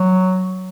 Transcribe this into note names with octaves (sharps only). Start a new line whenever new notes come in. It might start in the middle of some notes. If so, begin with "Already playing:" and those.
Already playing: F#3